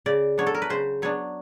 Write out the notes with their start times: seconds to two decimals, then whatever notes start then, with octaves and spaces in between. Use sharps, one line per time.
0.06 C#3 D5
0.38 F#3 B3 D4 C#5
0.47 A4
0.55 A#4
0.62 B4
0.70 C#3 C5
1.02 F#3 B3 D4 C#5